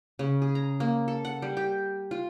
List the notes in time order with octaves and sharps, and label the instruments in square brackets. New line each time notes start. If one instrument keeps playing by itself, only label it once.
[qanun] C#3
G#4
A#5
A#3
A4
F#5
G3
G4
F4